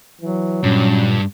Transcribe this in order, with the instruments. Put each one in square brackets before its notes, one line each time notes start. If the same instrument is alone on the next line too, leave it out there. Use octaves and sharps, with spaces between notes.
[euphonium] E3 [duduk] F#3
[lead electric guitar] G2 [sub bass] A#2 [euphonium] C#4